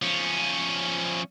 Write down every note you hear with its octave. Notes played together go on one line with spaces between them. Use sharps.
F3 C#4